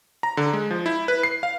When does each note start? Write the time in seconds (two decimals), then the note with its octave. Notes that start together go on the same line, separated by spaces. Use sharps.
0.23 A#5
0.37 D3
0.53 G#3
0.71 F3
0.86 E4
1.08 B4
1.23 C7
1.43 F5